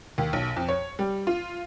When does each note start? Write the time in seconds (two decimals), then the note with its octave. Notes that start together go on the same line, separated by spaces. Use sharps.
0.18 D#2
0.33 B1
0.56 F2
0.69 C#5
0.99 G3
1.27 F4